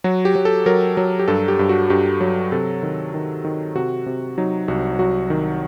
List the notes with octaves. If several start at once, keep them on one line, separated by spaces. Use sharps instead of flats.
F#3 F#4
G4
F#3
A4
F#3 A#4
F#3
G4
G2 A4
G4
G2
F#4
G2 G4
F#3
C3 A4
D#3
D#3
D#3
C3 F#4
C3
F#3 D#4
C2 F#4
F#3 F#4
D#3